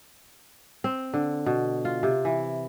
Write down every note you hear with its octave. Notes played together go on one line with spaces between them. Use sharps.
C4
D3
B2
F4
C3
E3